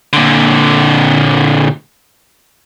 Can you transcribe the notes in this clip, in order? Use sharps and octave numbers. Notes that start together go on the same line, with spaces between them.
A#2 D3